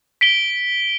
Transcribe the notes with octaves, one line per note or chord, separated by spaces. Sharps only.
B6 D7 G7